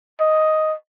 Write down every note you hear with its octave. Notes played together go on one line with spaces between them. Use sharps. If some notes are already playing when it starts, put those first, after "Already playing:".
D#5